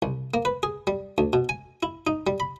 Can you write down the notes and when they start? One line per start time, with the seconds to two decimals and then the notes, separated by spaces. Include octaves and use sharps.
0.02 C2
0.34 A#3
0.45 B4
0.63 G#4
0.87 G3
1.18 D2
1.33 B2
1.49 G#5
1.83 E4
2.07 D#4
2.27 G3
2.40 B5